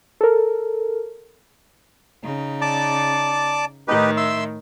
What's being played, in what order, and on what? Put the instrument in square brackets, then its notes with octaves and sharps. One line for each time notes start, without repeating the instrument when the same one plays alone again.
[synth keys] A4 A#4
[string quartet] C#3 D#4
[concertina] D5 A5 D6
[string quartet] A2 D#3 [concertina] D#4 G4 B4
[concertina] E5 C6 E6